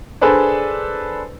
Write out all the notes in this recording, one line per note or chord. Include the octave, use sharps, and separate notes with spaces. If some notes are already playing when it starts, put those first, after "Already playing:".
D4 G#4 A4 B4 C5 D5